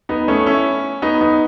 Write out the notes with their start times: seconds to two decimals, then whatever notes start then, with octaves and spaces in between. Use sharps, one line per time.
0.09 B3 D#4
0.28 A3 C#4
0.46 C#4 E4
1.02 B3 D#4
1.21 B3 D#4